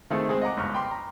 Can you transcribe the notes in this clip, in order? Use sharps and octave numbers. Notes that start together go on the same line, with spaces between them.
D#3 A3 C4 E4 G#4 A4
G#3 C4 G#4
D#5 F#5 A#5 D6
G1 C#2 C#6 F6
G5 B5 C6 D6
A#5